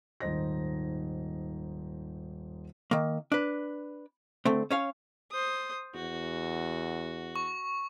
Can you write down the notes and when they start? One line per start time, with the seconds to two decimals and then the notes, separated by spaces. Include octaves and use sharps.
0.20 D#1 G#2 D#4 C5 D#5 A#6
2.91 D#3 A#3
3.32 D4 B4
4.45 D3 A3 C4
4.71 C#4 C#5 F5
5.31 C5 D#6
5.95 E2 F#4
7.36 C#6